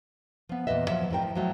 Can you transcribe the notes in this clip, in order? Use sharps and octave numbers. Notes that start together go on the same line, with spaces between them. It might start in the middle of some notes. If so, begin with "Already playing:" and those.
F3 B3
E2 A#2 D#3 B4 D#5 E5
F3 F#3 E5
F2 A2 A#4 G5
F3
F3 F#3 A3